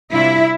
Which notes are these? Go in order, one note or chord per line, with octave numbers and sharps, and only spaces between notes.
C3 G3 D4 E4 F4 E5